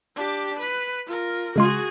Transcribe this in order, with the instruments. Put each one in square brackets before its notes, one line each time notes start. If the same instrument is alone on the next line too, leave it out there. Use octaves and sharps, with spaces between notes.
[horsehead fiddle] D4 G4
B4
F4 A#4
[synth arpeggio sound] C#3 G#3 C6 [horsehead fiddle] F#4 G#4